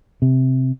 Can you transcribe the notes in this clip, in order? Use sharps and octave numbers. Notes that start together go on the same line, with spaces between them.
C3